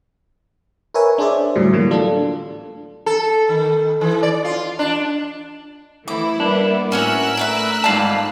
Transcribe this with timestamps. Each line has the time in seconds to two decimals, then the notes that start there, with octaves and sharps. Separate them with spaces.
0.94 A#4 B4 C#5 E5 G#5
1.18 D4 G#4 C5 D5 E5
1.55 A2 D3 F#3 G3
1.73 A2 D3 E3 F#3 A#3 B3
1.91 D4 F4 A4
3.06 A4
3.49 D#3
4.01 E3
4.23 D5
4.45 F4
4.79 D4
6.08 E3 A3 E4 D6
6.40 G3 A#3 B3 D4
6.92 A2 C#4 F#4 A#4 E5 E6 F#6
7.37 A3 A#4 B4 E5
7.84 G#2 F4 D5 A5